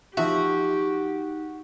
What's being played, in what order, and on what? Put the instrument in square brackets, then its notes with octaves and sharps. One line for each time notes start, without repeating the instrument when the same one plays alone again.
[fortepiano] F3 E5 [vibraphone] D#4 [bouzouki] F#4 [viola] G4